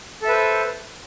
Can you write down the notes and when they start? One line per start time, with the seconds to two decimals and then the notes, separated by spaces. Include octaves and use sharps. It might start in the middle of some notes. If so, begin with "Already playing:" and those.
0.22 A4
0.25 E5
0.28 B4
0.32 C5